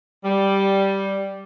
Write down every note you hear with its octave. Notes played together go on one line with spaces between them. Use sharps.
G3